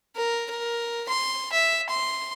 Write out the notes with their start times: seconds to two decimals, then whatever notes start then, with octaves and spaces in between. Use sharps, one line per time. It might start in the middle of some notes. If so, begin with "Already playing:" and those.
0.16 A#4
0.50 A#4
1.08 C6
1.52 E5
1.89 C6